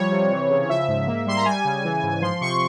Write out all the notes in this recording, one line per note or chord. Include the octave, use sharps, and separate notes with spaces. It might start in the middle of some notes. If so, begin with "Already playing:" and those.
Already playing: F3 G3 C#5
C3
E3
C#3
F3 E5
G#2
A#3
G3 C6
A#5
G3 G#5
C#3
E3
G#2
F3 C6
C3 C#6